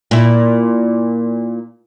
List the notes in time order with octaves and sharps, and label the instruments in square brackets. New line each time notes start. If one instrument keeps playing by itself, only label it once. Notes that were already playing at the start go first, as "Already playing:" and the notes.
[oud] A#2 E4